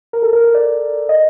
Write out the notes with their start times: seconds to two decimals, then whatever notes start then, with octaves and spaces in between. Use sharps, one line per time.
0.13 A#4
0.23 A4
0.33 A#4
0.44 A#4
0.54 D5
1.09 D#5